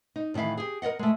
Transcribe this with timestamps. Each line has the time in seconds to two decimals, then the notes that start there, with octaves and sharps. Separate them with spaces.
0.16 D#4
0.34 A2 D#3 E3 E4 F5
0.57 G4 G#4
0.82 A#4 C#5 D#5 F#5
0.99 G#3 A3